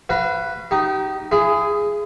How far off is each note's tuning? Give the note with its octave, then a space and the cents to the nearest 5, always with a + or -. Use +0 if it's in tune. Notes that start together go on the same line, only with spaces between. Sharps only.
F#4 +0 B4 +0 F5 -35
D#4 +0 G4 -35
E4 +40 G#4 +0